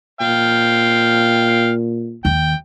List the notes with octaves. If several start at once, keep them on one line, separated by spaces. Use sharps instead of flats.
A#2 F5 G5
D#2 G5